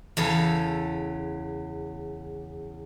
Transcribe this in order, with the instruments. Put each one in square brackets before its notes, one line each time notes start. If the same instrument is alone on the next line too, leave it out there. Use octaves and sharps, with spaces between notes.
[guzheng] E2 C#3 A4